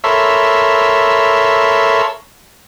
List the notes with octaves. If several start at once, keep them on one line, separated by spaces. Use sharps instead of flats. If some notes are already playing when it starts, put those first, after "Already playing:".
A4 A#4 C#5 E5 B5 C6